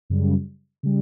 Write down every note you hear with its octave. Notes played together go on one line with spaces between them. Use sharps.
F#2 C#3 G3
C#3 G3